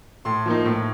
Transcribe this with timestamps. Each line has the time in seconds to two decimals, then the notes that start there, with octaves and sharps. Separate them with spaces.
0.25 A2 C6
0.46 F3 A#3 D#4
0.65 A2